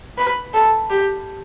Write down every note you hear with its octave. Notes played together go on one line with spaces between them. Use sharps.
B4
A4
G4